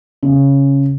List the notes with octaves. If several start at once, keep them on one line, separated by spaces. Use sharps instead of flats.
C#3